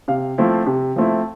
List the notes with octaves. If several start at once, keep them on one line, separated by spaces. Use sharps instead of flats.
C3 F5
F3 A3 C4 E4
C3
F3 A3 C4 E4